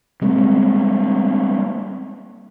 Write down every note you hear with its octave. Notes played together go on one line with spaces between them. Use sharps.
G3 G#3 A#3 C4